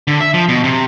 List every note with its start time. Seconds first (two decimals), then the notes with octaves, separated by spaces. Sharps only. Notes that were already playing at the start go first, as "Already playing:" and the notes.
0.08 D3
0.21 E5
0.34 F3
0.49 B2
0.64 C3